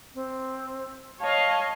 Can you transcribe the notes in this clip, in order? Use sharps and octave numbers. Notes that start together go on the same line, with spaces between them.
C4
C#5 D#5 F5 A5